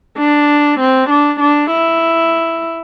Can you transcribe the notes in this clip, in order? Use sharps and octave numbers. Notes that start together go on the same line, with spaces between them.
D4
C4
D4
D4
E4